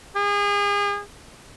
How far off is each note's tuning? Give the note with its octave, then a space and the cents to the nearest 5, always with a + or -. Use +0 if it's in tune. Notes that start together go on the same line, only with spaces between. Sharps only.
G#4 -35